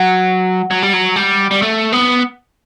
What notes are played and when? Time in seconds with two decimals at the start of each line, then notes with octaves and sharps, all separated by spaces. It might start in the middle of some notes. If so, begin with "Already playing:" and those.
Already playing: F#3 F#5
0.71 F#3
0.83 G3
0.93 F#3
1.16 G3
1.51 G3
1.62 A3
1.92 B3